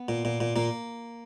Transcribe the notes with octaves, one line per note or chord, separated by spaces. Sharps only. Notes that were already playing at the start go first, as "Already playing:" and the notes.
Already playing: B3
A#2
A#2
A#2
A#2 A#3